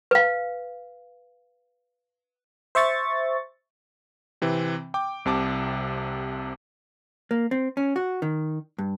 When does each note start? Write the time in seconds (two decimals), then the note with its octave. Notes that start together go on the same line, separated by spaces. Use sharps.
0.11 B4 F5
2.75 C5 E5 C#6 A6
4.42 C3 E3 C4
4.94 G5 D6
5.25 C2 C3 A5 D6
7.31 A#3
7.51 C4
7.77 C#4
7.96 F#4
8.22 D#3
8.78 G2